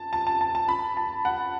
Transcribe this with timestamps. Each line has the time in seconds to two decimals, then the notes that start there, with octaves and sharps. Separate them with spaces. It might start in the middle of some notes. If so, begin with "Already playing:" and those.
Already playing: A5
0.13 A5
0.27 A5
0.41 A5
0.55 A5
0.68 B5
0.97 A5
1.25 F#5